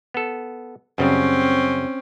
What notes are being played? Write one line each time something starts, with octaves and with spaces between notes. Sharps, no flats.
B3 A4
F#2 C#3 G3 C4 C#4